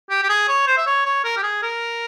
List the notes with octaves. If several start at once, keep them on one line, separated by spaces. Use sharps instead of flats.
G4
G4
G#4
C#5
C5
E5
C#5
C#5
A#4
G4
G#4
A#4